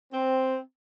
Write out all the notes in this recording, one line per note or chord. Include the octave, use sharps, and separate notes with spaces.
C4